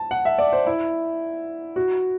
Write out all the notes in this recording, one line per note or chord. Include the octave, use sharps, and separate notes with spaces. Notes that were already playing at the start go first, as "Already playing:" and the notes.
Already playing: A5
F#5
E5
D5
C5
E4
F#4